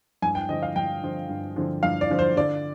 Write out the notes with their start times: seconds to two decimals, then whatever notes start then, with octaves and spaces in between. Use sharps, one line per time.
0.22 G2 G#5
0.35 G5
0.49 D3 F3 D#5
0.63 F5
0.76 G2 G5
1.03 D3 F3
1.29 G2
1.56 D3 F3
1.83 G2 F5
2.01 D5
2.10 D3 F3
2.19 C5
2.37 D3 D5